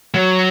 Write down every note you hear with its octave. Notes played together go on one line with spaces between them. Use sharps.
F#3